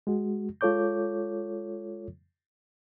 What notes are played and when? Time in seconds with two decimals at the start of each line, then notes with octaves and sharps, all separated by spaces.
0.07 G#3 F#4
0.61 G#3 F4 A4 C#5 D6 G6